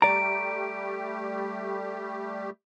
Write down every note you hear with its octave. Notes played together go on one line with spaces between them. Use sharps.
G3 A3 G4 D5 A#5 D7